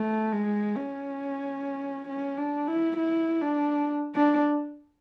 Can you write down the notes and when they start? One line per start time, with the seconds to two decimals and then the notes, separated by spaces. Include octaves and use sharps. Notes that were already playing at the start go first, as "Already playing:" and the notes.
Already playing: A3
0.32 G#3
0.76 C#4
2.09 C#4
2.37 D4
2.68 E4
2.97 E4
3.42 D4
4.15 D4